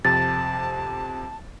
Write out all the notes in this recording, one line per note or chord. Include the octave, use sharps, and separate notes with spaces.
F2 C3 A5 A6